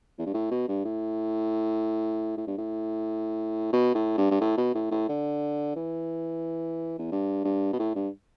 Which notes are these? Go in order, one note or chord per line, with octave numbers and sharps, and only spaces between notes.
E2
G2
A2
B2
G2
A2
A2
G2
A2
B2
A2
G2
G2
A2
B2
A2
A2
D3
E3
E2
G2
G2
B2
A2
G2